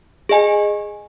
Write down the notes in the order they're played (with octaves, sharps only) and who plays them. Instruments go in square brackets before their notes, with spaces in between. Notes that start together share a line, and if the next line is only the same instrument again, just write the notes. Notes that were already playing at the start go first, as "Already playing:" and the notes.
[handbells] G#4 D#5 G#5